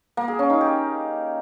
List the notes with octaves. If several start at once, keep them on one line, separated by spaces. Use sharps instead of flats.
A#3
G#4
C#4
D#4
G4